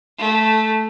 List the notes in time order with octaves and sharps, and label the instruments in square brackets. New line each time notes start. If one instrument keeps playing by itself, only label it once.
[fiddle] A3